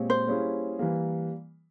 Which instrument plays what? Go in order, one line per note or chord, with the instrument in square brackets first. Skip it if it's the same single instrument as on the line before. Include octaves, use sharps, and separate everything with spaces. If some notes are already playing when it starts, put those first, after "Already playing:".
Already playing: [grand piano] A#2 G#3 C4 G4 C#5
[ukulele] C5
[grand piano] G3 A#3 C#4 E4 G#4
E3 G3 A#3